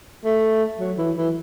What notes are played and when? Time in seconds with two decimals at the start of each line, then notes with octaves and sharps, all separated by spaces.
0.25 A3
0.80 F#3
0.98 E3
1.16 E3